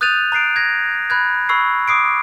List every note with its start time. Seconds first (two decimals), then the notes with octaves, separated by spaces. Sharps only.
0.01 D#6 F#6 G6 A6 D#7 F7
0.32 A#5 F#6 C7 D7
0.56 G#6 A#6
1.10 B5 F#6 G#6
1.49 B5 C#6 E6 C7
1.88 D6 D#6 C7 D7